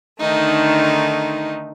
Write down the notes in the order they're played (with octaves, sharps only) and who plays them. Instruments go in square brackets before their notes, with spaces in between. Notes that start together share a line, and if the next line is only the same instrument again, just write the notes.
[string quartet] D3 D#3 A3 D#4